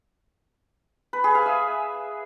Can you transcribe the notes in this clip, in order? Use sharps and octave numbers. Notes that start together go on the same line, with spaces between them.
B4
G#4
F5
E5